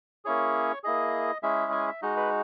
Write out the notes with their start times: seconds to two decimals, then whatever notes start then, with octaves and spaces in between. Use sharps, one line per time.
0.25 A#3 C#4 E4 G#4 C#5
0.84 A#3 E4 G#4 D#5
1.43 G#3 C#4 E4 G#4 E5
1.72 G#5
1.88 E5
2.02 G#3 D#4 F#4 D#5
2.17 B4